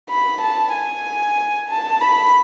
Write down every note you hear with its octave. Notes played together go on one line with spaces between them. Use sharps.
B5
A5
G#5
A5
B5